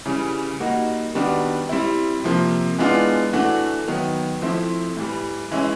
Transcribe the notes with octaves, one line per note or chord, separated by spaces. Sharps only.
C#3 E3 G3
G3 A#3 D#4 F#4
D#3 G3 B3 D4 F#4
G3 C4 E4
C3 F3 A#3
E3 G#3 B3 D4 F4
E3 A3 D4 F#4
D#3 F#3 B3
F3 A3 C4 E4
A2 E3 G3
E3 G#3 C#4 E4